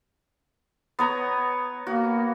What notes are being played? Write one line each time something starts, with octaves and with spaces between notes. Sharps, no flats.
B3 C#5 A#5
A#3 F#4